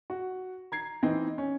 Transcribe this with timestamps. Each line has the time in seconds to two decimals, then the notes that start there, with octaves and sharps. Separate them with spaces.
0.10 F#4
0.72 A#5 G#6 C7
1.03 E3 C4 D#4
1.38 C#4